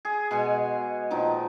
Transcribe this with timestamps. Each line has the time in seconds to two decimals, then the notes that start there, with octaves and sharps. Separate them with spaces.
0.05 G#4
0.31 B2 G#3 F#5 G#5
1.11 A#2 D#3 F3 D#4